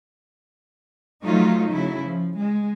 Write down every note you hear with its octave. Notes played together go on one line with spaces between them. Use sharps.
F3 F#3 A3 D#4 F4
C#3 F#3 E4
F3
G#3